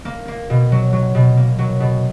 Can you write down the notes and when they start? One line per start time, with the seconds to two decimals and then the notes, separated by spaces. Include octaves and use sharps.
0.05 A#3
0.28 A#3
0.50 B2
0.72 F#3
0.93 F#3
1.15 B2
1.37 A#3
1.59 F#3
1.80 B2